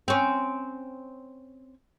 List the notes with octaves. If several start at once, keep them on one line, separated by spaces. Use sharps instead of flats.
C4 C#4